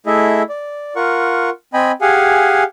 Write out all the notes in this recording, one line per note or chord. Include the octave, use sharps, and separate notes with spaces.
A3 E4 G#4 D#5 E5
D5
F4 A#4 F#5 C#6
C4 D#5 G5 G#5 B5
G4 G#4 F5 F#5 G#5